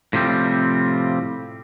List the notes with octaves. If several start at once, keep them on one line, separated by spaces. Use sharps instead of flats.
A2 C3 F3 G3 C4